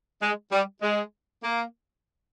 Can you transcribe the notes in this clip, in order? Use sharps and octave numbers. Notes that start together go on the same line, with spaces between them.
G#3
G3
G#3
A#3